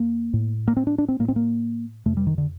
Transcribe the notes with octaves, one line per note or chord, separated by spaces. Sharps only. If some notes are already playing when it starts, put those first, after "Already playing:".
Already playing: F2 A#3
A2
A#3
C4
D4
D4
C4
A2 A#3
C4
A#3
F2 C3 A3
G3
D#3
D3